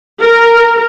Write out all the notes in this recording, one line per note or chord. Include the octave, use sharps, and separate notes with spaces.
A#4